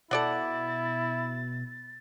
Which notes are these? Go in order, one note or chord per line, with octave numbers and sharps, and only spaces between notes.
B2 E4 A4 D5 F#5 A6